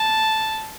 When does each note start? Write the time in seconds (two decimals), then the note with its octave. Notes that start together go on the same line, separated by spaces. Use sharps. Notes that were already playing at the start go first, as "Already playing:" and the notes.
Already playing: A5